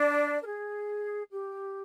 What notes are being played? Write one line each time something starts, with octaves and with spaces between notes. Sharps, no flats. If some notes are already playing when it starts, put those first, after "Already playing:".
Already playing: D4 D5
A#4
G#4
G4